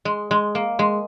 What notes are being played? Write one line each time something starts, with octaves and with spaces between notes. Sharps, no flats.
G#3
G#3
A#3
G#3